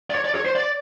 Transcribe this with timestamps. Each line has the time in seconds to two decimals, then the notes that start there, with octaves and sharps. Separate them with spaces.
0.10 D5
0.15 C#5
0.25 D5
0.35 C#5
0.45 C5
0.55 D5